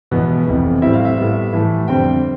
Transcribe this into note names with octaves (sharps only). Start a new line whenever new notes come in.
E1 E2 B2 B3
F1 F2 E3
A2 G3 C4 E4 E5
F5
E5
A2 G3 B3
A2 E3 A3
F2 D3 G3 C4 G5